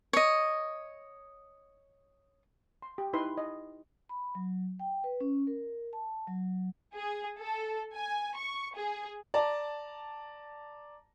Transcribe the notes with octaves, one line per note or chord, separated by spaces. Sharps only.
C#5 D#5
C6
G4
D#4 E4 B4 C6
D#5
B5
F#3
G5
B4
C#4
A#4
A5
F#3
G#4
A4
G#5
C#6
G#4
D5 A5 A#5